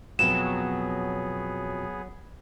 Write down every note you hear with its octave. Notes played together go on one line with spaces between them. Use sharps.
F2 B2 F#3 B3 G#4 E7